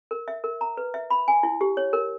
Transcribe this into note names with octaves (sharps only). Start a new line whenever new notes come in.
A#4
E5
A#4
A#5
B4
E5
B5
G#5
E4
G4
C#5
A#4